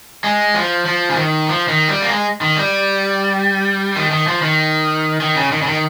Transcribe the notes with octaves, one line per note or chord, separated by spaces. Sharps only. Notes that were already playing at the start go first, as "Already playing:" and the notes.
G#3
F3
F3
C#3
D#3
F3
D#3
G3
A#3
G#3
D#3
G3
D#3
D#3
F3
D#3
D#3
C#3
D#3
C#3
D#3